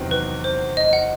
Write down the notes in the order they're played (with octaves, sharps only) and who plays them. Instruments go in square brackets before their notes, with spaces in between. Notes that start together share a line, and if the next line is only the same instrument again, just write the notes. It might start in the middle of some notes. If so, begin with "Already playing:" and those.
Already playing: [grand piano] E2 C3 D#3 F#3 C4
[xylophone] B4
C5
D#5
F#5